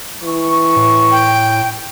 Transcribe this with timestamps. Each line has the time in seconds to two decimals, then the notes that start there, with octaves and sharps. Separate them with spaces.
0.23 E3 C#6
0.76 A2
1.11 G5